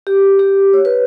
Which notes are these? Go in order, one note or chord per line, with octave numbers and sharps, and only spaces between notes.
G4
G4
C#5
B4